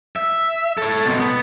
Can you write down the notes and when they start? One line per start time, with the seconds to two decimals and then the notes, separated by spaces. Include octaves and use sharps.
0.16 E5
0.78 A4 C#5
1.06 B2 C4
1.19 B3